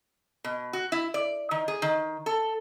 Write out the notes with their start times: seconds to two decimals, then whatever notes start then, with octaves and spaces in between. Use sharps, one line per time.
0.44 B2
0.73 F#4
0.92 E4
1.14 D5
1.51 D#3
1.68 G#4
1.82 D#3
2.26 A4